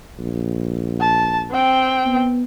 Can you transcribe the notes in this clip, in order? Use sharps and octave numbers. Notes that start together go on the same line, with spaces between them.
A#1
A5
C4 G5
B3